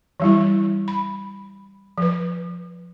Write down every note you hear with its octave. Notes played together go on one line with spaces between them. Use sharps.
E3 G3 E4
B5
F3 B4